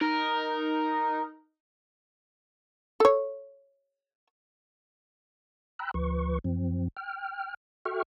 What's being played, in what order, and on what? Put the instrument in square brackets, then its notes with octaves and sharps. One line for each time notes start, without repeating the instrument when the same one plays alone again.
[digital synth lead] D#4 [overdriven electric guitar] A#4
[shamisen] A4 C#5
[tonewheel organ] G5 A#5 B5 E6 F#6
D2 F3 B4 C#6
F#2 F3 C4
G5 F6
F#4 A4 E5 G5 C#6 F6